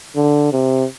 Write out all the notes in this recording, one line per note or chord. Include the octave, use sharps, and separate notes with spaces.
D3
C3